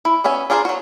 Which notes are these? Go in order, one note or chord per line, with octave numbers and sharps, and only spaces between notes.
E4
B3 C#4 E5 G#5
D4 F4 G#4 A#4 C5
F#3 F#4